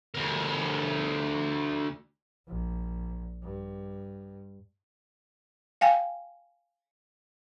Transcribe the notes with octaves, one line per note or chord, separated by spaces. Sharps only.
D2 A#4
A#1
G2
F5 G5 G#5